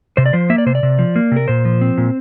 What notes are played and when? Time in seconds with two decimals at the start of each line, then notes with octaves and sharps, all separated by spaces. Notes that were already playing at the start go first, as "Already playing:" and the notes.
0.17 C3 C5
0.26 D5
0.33 F3 C5
0.50 A#3 E5
0.58 D5
0.66 C3 C5
0.75 D5
0.83 C3
0.99 F3
1.16 A#3
1.32 C3 A#4
1.48 A#2 C5
1.65 F3
1.81 C4
1.98 A#2